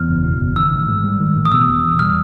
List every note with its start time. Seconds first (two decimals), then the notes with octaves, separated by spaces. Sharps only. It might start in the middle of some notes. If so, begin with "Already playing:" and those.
Already playing: E2 F6
0.08 F#1
0.24 B2
0.40 F#1
0.56 D#3 E6
0.72 A1
0.89 G#2
1.04 G3
1.20 D#3
1.36 A1
1.45 D#6
1.52 B2 E6
1.68 E1
1.84 E2
1.99 G3 F6